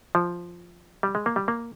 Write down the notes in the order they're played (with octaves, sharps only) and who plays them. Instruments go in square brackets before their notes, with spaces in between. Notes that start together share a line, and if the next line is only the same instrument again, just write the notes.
[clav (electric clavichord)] F3
G3
G#3
A#3
G3
A#3